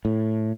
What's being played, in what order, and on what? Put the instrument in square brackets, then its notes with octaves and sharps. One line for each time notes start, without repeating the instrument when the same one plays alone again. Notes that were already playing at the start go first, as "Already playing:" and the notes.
[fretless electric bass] A2